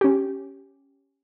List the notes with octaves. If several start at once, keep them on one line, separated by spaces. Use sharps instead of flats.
C#4 G4